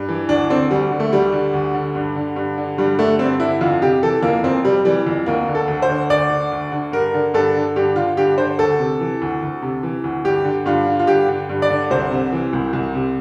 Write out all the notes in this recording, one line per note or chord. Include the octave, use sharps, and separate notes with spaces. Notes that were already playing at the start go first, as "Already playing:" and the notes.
Already playing: G2
E3
D2 D4
D3 C4
D2 G3
D3
A3
D2 G3
D3
D2
D3
G2
D3
G2
D3
G2 G3
D3 A3
G2 C4
D3 E4
F2 F4
C3 G4
E3 A4
F2 A#3
F2 C4
C3 G3
E3 G3
F2
D2 A#3
D3
A4
D2
C5
D3
D2 D5
D3
D2
D3
G2 A#4
D3
G2 A4
D3
G2 G4
D3 F4
G2 G4
D3 C5
D2 A4
C3
E3
D2
D2
C3
E3
D2
G2 G4
D3
G2 F4
D3
F4
G2 G4
D3
G2
D5
D3
C2 C5
C3
E3
C2
C2
C3